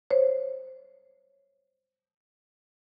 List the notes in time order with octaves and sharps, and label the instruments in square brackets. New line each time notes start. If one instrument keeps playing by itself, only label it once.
[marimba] C5 C#5